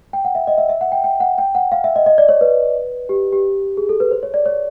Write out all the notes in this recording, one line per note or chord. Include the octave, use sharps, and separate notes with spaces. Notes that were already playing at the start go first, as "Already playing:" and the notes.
G5
F#5
E5
D#5
E5
E5
F#5
G5
G5
F#5
G5
F#5
F5
E5
D#5
D#5
D5
C#5
B4
G4
G4
G#4
A4
B4
C5
C#5
D5
C#5